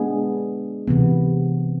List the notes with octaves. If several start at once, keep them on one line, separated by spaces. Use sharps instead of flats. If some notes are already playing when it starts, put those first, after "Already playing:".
Already playing: G#3 B3 D4 G#4
C3 E3 B3